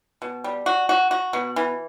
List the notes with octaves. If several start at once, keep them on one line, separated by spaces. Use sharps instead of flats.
B2
G3
F#4
F#4
F#4
B2
E3